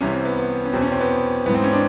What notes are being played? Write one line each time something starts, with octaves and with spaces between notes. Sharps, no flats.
C2 C3 E3 C#4
C4
B3
B3
C#4
E2 B2 C4
C#4
C4
B3
G#2 E3 B3
C4
C#4
D4